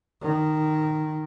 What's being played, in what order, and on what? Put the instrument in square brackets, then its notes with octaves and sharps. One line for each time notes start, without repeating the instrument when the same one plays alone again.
[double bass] D#3